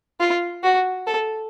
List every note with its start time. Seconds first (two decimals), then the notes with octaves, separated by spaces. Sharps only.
0.20 F4
0.63 F#4
1.07 A4